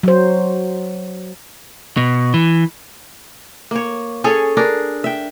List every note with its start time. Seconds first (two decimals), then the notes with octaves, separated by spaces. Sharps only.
0.03 F#3 C5
1.97 B2
2.34 E3
3.71 A#3 C#5
4.24 C#4 G#4 A4 C#5
4.57 D4 G#4 A#4
5.04 E5 G5